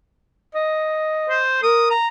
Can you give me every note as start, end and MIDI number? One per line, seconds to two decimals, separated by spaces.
0.55 1.43 75
1.30 1.59 72
1.63 1.92 70
1.63 1.85 87
1.90 2.08 82